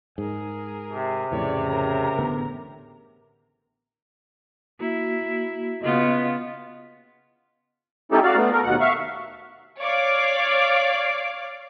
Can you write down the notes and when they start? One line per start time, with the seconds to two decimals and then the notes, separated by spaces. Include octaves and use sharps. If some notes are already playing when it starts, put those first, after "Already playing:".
0.18 G#2 G#4 A#4
0.90 C3
1.32 F2 A2 C#3 E3 C#5 D5
1.67 A#4 A#5
2.19 A1 D3 B3
4.80 A#3 E4 F#4
5.82 C#3 B3 F4 D#5
8.12 A3 C#4 D#4 E4 G4 A4
8.23 F#4 D5 F5
8.36 A3 B3
8.52 A3 A#4
8.64 D#2 B2 F#5
8.81 E5 F5 C#6
9.80 C#5 D5 F5 D6